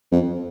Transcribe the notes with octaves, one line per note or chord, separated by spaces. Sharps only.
F2